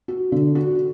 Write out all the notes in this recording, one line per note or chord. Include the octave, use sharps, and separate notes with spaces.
F#4
D3
F#4